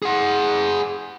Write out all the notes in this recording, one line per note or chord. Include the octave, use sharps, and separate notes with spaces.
G#4 F#5